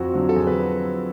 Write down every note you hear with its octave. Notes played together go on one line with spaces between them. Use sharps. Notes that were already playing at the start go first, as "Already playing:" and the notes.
Already playing: F2 F#4
D3 F#3
A4
F2 G#4
B4